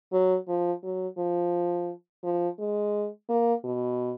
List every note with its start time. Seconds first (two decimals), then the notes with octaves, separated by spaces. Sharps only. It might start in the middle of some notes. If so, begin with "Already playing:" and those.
0.13 F#3
0.48 F3
0.83 F#3
1.18 F3
2.24 F3
2.59 G#3
3.29 A#3
3.64 B2